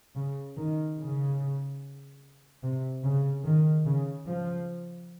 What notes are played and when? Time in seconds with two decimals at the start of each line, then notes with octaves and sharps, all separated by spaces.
0.16 C#3
0.57 D#3
0.98 C#3
2.62 C3
3.03 C#3
3.45 D#3
3.86 C#3
4.27 F3